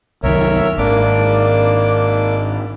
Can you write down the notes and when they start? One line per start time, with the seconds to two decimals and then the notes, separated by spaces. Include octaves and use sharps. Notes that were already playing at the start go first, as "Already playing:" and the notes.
0.23 C2 F#2 D#3 A#4 C#5 E5
0.78 G#1 A#3 D4 D6